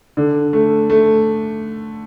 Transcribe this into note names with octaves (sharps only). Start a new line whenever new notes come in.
D3
A3
A3